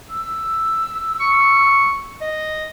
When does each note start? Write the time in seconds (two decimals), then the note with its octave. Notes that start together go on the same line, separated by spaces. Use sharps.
0.10 E6
1.20 C#6
2.21 D#5